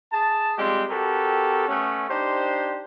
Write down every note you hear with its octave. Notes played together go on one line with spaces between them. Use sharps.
G#4 A5
F3 G3 G#3 C4 G4
C4 F#4 G4 A4 A#4
A3 B3 C#4
D4 D#4 G4 C5